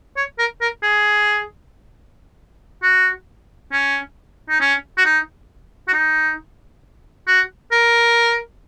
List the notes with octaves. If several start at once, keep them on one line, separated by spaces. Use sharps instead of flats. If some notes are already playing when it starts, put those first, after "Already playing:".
C#5
A#4
A#4
G#4
F#4
C#4
D#4
C#4
F#4
D#4
F#4
D#4
F#4
A#4